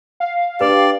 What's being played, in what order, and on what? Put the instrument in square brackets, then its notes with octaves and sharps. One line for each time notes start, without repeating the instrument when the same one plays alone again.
[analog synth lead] F5
[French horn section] D4 G4 [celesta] B4 [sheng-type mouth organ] D5